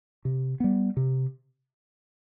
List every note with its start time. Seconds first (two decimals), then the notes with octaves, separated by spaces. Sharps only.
0.25 C3
0.60 G3 B3
0.97 C3